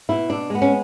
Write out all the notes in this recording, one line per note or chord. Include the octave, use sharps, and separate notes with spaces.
B2 E4
D4
G#3 B3
C#4